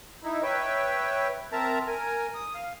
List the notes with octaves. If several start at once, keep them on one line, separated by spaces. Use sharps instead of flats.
D#4 E4
B4 C#5 E5 G5
C4 A#4 E5 A5 A#5
A#4 G#5
D#6
F5